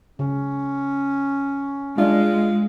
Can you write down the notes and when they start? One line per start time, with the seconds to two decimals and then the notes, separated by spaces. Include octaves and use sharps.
0.19 C#3 C#4
1.98 G#3 D4 F4